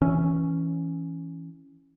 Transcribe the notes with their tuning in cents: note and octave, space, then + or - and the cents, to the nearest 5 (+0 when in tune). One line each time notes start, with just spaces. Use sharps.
E3 +0 C#4 +0